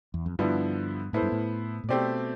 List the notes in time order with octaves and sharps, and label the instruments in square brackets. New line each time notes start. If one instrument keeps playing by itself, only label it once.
[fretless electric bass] E2
F2
[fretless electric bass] G2 [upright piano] D3 F3 B3 E4
[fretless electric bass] A2 [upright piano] B3 E4 A4 C5
[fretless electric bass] G2
A2
A2
[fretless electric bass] B2 [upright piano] A3 C4 G4 D5